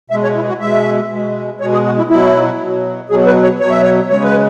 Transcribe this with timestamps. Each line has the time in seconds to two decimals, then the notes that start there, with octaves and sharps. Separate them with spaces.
0.10 B2 G#3 E5
0.23 C#5
0.35 E4
0.48 F#4
0.60 B2 G#3 E5
1.10 B2 G#3
1.60 B2 G#3 C#5
1.73 G#4
1.86 F#4
1.98 E4
2.10 B2 F#3 E4
2.60 B2 F#3
3.10 B2 F#3 G#4
3.27 B4
3.43 C#5
3.60 B2 F#3 C#5
3.71 E5
3.82 C#5
4.10 C#3 G#3 C#5
4.23 B4